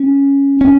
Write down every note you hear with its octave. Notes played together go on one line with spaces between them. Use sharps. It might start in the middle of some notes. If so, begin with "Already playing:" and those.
Already playing: C#4
C#4